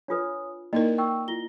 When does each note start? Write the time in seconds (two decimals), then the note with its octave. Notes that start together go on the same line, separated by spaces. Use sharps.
0.08 D4 F4 B4 C#5 G#5 D#6
0.73 A#3 D#4 E4 A#4 D5 D#5
0.98 G5 C#6 E6
1.28 E4 F4 A#6 G7